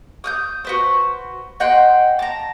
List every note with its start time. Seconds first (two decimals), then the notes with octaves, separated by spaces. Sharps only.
0.24 D#6 F6 G6
0.65 F#4 B4 C5
1.60 D#5 F#5 G5 C6
2.19 A5 A#5